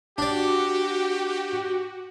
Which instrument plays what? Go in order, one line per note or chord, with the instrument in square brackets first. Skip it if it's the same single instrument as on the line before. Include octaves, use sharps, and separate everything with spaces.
[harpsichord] D4 D5 [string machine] F#4 [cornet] G4